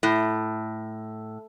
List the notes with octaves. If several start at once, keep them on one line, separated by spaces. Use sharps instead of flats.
A2